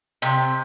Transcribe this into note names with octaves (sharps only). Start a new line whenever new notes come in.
C3